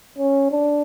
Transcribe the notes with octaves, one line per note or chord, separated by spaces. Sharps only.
C#4
D4